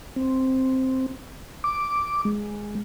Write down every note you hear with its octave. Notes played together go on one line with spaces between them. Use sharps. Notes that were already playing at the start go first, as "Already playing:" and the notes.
C4
D6
G#3